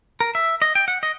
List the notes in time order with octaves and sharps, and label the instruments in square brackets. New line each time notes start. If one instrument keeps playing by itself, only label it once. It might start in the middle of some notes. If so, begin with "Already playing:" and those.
[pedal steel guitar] A#4
E5
D#5
G5
F#5
D#5